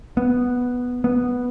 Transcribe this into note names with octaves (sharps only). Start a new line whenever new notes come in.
B3
B3